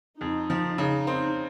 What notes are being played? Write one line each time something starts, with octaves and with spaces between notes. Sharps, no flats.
F2 D#4
F3
C#3 D#4
C4